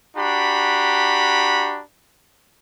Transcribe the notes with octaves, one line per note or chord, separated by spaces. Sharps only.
D4 F#4 G4 A#5 B5